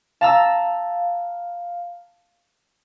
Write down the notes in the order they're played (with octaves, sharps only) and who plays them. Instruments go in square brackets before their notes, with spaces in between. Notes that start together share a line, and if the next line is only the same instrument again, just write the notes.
[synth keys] F5 [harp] A5 A#5 E6